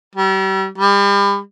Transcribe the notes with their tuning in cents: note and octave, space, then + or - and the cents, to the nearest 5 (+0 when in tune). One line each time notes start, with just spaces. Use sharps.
G3 -35
G3 +35